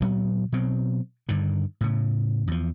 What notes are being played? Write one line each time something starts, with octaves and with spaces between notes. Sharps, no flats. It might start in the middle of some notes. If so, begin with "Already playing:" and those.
D2 A#2 F#3 B3
B2 F#3 C4
G2 D3 D#3
A2 C#3
E2 F3